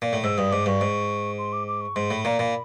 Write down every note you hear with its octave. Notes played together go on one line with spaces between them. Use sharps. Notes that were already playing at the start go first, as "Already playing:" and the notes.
A#2
A2
G#2 E6
G2 D#6
G#2 D6
G2 C#6
G#2
C6
D6
D6
C#6
G#2 C6
A2 B5
A#2 A#5
A#2 B5